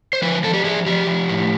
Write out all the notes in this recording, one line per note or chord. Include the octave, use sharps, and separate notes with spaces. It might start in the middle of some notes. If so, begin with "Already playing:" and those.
C5
F3 B4
F3 A4
G4
F3 G#4
F3 G4
F3
A2